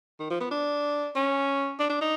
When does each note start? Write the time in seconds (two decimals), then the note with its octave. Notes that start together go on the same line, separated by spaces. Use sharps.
0.19 D#3
0.30 F3
0.40 B3
0.51 D4
1.16 C#4
1.79 D4
1.89 D4
2.01 D#4